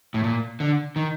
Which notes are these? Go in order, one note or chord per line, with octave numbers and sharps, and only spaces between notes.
A2
A#2
D3
D#3